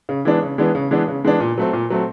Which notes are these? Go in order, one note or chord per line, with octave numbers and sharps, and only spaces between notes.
C#3
E3 G#3 B3 D4
C#3
E3 G#3 B3 D4
C#3
E3 G#3 B3 D4
C#3
E3 G#3 B3 D4
A#2
F#3 A3 C4
A#2
F#3 A3 C4